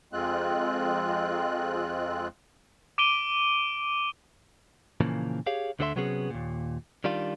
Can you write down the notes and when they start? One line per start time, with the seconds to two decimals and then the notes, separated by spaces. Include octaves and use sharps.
0.13 F2 G#3 C4 F4 F#6
2.98 D6 D7 D#7 G7
5.01 A#2 C#3 E3 F3 A#3
5.46 G4 G#4 C#5 F5
5.79 D2 D3 A4 C5 E5 C6
5.96 C3 F#3 B3 C#4 G#4
6.30 D#2 A#2
7.04 D#3 G3 D4 F4